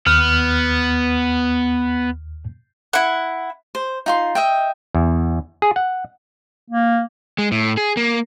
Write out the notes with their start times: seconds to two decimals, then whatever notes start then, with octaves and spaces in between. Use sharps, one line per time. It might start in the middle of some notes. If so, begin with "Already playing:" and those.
0.06 D#2 B3 F6
2.93 E4 F#5
3.75 C5
4.06 D#4 F4 C6
4.35 D#5 E5 G5
4.95 E2
5.62 G#4
5.76 F#5
6.70 A#3
7.38 G#3
7.52 A2
7.77 G#4
7.97 A#3